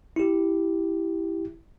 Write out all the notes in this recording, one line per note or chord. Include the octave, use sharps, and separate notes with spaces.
E4 G4